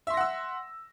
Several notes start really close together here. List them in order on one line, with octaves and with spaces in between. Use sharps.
E5 C6 A#6 F#5 E6